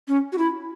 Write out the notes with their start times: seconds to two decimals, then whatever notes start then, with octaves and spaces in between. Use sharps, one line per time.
0.08 C#4
0.32 F#4
0.38 E4